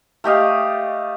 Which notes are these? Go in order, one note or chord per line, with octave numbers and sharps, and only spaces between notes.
A3 G4 D#5 F5